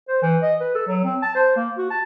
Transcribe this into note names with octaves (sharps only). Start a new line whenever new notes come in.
C5
E3
D#5
B4
A4
F#3
C4
A5
C5
A#3
F#4
A5